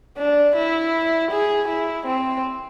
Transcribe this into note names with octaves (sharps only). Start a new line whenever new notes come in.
D4
E4
G#4
E4
C4